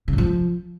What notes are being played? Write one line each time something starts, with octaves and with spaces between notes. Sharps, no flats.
C#3
G#2
F3